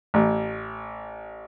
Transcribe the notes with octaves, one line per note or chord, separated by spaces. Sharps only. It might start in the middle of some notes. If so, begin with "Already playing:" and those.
A1